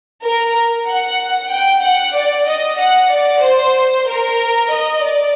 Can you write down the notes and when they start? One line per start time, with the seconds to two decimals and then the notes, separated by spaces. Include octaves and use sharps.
0.22 A#4
0.86 F#5
1.50 G5
1.83 F#5
2.15 D5
2.47 D#5
2.79 F#5
3.10 D5
3.43 C5
4.07 A#4
4.70 D#5
5.03 D5